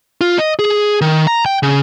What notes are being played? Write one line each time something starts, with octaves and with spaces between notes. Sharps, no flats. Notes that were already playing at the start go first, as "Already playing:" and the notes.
F4
D#5
G#4
D#3
A#5
G5
C#3